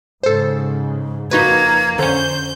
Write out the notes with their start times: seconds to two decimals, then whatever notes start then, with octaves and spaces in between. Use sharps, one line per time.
0.23 G#2 C#3 A4 C5
1.31 F2 A#3 D#4 F#4 B4 G#6
1.99 F2 D3 C#4 C5 G6